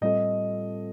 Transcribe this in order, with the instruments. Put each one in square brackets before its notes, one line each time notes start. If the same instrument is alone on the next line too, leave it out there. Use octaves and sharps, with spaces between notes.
[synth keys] A2 G3 C4 F4 A4 [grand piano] D#5